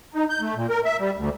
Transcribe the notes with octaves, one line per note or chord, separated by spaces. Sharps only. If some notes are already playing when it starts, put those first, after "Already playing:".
D#4
G6
A3
A#2
A#4
E5
G3
D2